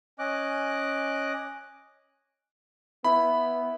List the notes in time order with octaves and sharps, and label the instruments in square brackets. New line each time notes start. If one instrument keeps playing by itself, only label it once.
[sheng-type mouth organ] C#4 D#5 D6 F#6
[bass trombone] B3 [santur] E4 [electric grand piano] B5